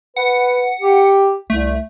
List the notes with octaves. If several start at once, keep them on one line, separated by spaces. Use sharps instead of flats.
B4 F#5
G4
C2 A3